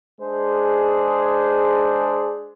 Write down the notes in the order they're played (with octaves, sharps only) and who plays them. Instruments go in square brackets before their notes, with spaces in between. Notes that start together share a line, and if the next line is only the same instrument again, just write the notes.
[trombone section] G#3 D4 G#4 C5